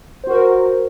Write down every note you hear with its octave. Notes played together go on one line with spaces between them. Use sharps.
F#4 A#4 C5